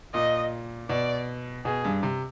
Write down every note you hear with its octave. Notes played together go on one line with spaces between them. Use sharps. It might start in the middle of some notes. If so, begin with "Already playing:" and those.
A#2 D#5
B2 D5
B2 G#4
G2
C3